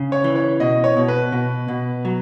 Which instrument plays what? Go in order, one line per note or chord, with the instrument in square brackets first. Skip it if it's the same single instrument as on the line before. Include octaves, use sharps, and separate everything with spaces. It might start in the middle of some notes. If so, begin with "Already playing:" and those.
Already playing: [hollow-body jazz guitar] C#3
[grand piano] C#5
[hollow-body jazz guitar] E3
[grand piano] C#5
[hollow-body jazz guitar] B2 [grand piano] D#5
[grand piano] C#5
[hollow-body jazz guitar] B2
[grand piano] B4
[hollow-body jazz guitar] B2
B2
F#3